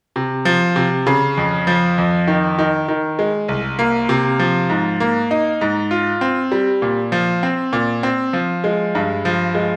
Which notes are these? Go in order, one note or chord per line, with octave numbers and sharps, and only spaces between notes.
C3
F3
C3
C#3
F2
F3
F2
D#3
D#3
D#3
G#3
C2
A#3
C3
F3
G#2
A#3
D#4
G#2
F4
C4
G3
A#2
F3
C4
A#2
C4
F3
G#3
G2
F3
G#3